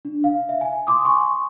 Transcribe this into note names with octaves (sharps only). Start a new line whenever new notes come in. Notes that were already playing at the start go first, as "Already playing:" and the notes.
D4
F5
E5
G#5
C6 D6 D#6
G#5 C6 C#6